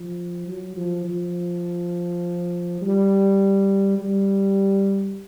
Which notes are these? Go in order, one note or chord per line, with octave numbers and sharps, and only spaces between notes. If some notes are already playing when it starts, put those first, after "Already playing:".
Already playing: F3
F#3
F3
F3
G3
G3